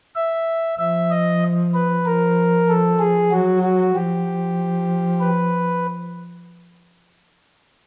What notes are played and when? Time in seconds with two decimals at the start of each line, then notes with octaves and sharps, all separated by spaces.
0.15 E5
0.79 F3 E5
1.10 D#5
1.74 B4
2.05 F3 A#4
2.68 F3 A4
2.99 G#4
3.32 F#3 F#4
3.63 F#4
3.94 F3 G4
5.20 B4